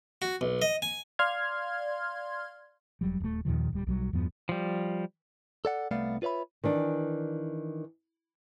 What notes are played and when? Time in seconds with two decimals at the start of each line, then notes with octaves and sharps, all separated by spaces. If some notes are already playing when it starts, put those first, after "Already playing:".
0.22 F#4
0.41 B1
0.62 D#5
0.82 G#5
1.19 D5 F5 C6 F6 G#6
3.01 F1 F#3 G3
3.20 D#1 A3
3.45 D#2 A#2 D#3 F3
3.72 D1 G3
3.87 B1 F#3 G3
4.13 E2 G2 F3 B3
4.49 F3 G3
5.65 A4 D5 F#5
5.91 C2 A3 B3 D5 F5
6.22 F4 B4 C#5 E5 B5
6.64 D#3 E3 D4